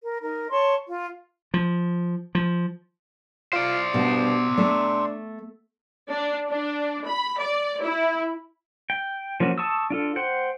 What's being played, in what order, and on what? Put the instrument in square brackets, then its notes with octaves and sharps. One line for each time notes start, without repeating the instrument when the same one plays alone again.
[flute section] A#4
D#4 A#4
C#5 A5 C6 C#6
F4
[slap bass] F3
F3
[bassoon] F4 [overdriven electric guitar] C5 D5
[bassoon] G2 [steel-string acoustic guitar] B2
[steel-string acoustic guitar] A3 [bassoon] D4
[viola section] D4
D4
B5
D5
E4
[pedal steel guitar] G5
F3 A#3 C#4 F#4
A5 C#6 D#6 E6
D4 F4 A4
C5 F#5 G5